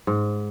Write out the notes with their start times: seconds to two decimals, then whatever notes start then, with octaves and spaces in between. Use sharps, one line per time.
0.07 G#2